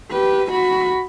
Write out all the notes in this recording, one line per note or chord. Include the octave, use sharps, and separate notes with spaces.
G4 B4
F#4 B5